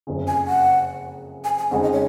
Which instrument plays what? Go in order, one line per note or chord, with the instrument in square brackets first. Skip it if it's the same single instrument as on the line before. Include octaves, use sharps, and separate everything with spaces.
[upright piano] F#1 F2 C#3
[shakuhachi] G#5
F#5
G#5
G#5
[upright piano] F2 C#3 G#3 D#4 [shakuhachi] F#5
[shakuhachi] D#5
C#5